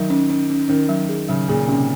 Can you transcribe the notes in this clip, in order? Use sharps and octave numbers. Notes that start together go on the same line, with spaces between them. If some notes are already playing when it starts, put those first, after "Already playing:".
Already playing: D#3 F#3
C#4
C#4
C#4
D#3 C#4
F#3
G#4
C#3 F#3
A#2 G#4
C3 C#4